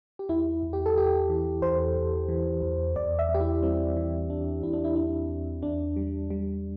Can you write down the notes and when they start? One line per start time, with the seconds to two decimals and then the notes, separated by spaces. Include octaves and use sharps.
0.19 G4
0.29 E2 E4
0.63 E2
0.73 G4
0.86 A4
0.95 E2 G4
1.29 E3
1.62 E2 C5
1.96 E2
2.29 E3
2.62 E2
2.96 E2 D5
3.19 E5
3.29 E2
3.34 G4
3.40 E4
3.63 G3 C4
3.96 E3
4.29 E2 D4
4.63 E2 E4
4.73 D4
4.84 E4
4.96 E2 D4
5.29 E2
5.63 E2 D4
5.96 G3
6.30 G3